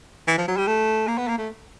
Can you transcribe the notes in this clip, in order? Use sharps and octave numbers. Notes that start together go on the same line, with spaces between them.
E3
F3
F#3
G3
A3
A#3
B3
A#3
A3